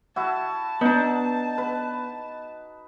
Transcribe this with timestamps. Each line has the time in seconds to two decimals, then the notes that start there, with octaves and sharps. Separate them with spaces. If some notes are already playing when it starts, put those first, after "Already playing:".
0.16 E4 F#4 A5
0.81 B3 D4 D#4
1.58 B4